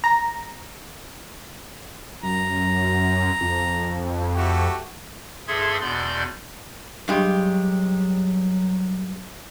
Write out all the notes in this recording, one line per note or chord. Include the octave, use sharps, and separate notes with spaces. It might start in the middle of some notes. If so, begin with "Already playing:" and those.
A#5
F#2 A#5
F2
A3 F#4 G4
G2 G#4 A4 E5 C6 G#6
E2 B2 D5 C6 G6
G2 F#3 G#3 G4